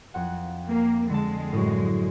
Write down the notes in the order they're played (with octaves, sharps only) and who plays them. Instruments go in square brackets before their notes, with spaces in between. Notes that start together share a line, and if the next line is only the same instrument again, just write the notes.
[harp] F2 C5 F#5
[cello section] A#3
[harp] D3 A5 [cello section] G#3
[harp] F#2 A2